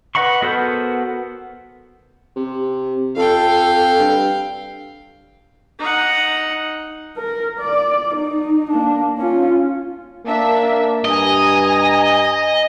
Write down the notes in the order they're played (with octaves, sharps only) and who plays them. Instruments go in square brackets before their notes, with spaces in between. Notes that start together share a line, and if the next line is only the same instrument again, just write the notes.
[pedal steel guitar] B4 D#5 F#5 B5 C#6
B3 F#4 A4 A#4 C5
[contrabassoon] C3
[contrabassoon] F2 [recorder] A4 [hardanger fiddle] F5 G5
[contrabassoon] G2
[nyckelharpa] D#4 F#5
[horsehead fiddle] A#4
D5
D#4
A#3 D4
C#4 F4
[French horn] A#3 [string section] D4 E5
[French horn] G2 [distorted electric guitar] D#5 [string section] G#5 A#5 D#6